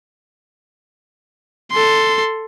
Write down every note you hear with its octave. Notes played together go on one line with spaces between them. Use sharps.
A4 C6